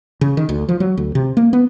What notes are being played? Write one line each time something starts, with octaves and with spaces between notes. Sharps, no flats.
C#3
D#3
D2
F3
F#3
D2
C3
A#3
B3